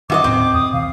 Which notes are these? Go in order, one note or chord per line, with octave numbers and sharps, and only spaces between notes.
F#2 D#3 F#3 F#4 D#5 D6
D#2 A2 C4
E2 D#6
D#1 B1 D#3 F5